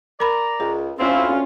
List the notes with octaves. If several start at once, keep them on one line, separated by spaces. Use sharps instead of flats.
A#4 D5 A#5 B5
C#2 G#4
D2 C4 C#4 E4 F4 F5